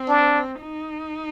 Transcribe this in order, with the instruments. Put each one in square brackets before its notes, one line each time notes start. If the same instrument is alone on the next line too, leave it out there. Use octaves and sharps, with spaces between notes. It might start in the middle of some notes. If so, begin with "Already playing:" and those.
Already playing: [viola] C4
[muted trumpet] D4
[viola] D#4